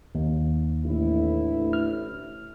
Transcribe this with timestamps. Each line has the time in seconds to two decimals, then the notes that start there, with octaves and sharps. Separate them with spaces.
0.15 D#2
0.85 A1 D2 E4
1.73 F6